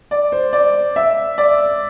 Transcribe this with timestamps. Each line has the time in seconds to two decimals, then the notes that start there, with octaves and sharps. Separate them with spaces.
0.11 D5
0.32 C5
0.53 D5
0.96 E5
1.38 D5